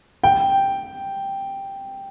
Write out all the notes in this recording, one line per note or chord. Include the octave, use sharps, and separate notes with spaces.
G5